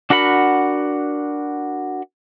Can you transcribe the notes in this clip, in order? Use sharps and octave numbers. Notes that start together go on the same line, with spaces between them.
D4 F#4 A#4 F#5 B5